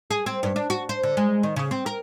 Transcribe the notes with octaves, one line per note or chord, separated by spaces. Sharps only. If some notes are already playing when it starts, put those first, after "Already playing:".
G#4
C4
G2
D4
F#4
C5
D3
G#3
D#3
C#3
C4
A#4